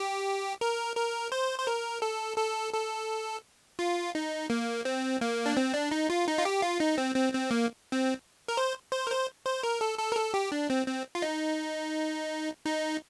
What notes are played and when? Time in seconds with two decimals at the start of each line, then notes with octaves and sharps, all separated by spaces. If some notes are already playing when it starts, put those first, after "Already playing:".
Already playing: G4
0.61 A#4
0.96 A#4
1.32 C5
1.59 C5
1.67 A#4
2.02 A4
2.37 A4
2.73 A4
3.79 F4
4.15 D#4
4.50 A#3
4.85 C4
5.21 A#3
5.46 D4
5.57 C4
5.74 D4
5.91 D#4
6.10 F4
6.28 D#4
6.39 F4
6.45 G4
6.62 F4
6.80 D#4
6.98 C4
7.16 C4
7.33 C4
7.51 A#3
7.92 C4
8.48 A#4
8.57 C5
8.92 C5
9.07 A#4
9.11 C5
9.46 C5
9.63 A#4
9.81 A4
9.99 A4
10.12 A#4
10.16 A4
10.34 G4
10.52 D4
10.70 C4
10.87 C4
11.15 F4
11.22 D#4
12.65 D#4